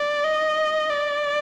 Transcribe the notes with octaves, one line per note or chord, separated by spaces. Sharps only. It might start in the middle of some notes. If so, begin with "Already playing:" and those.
Already playing: D5
D#5
D5